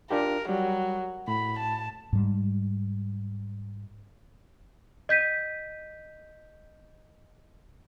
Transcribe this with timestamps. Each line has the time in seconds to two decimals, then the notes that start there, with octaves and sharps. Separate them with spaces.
0.11 D4 F4 G4 A#4
0.49 F#3 G3
1.28 A2 B5
1.59 A5
2.13 G#2 G3
5.09 D#5 G6 B6 D#7